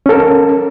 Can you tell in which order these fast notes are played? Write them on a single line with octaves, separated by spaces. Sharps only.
C#4 A4 A#4